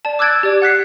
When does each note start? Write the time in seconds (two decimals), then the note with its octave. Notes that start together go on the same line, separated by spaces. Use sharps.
0.05 D5 A5
0.19 D6 E6 F#6 G#6 A6 D7
0.43 G4 D5
0.62 F#5 F#6 B6 C7